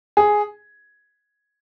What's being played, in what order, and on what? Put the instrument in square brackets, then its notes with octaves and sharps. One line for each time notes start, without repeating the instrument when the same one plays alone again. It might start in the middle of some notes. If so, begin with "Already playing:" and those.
[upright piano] G#4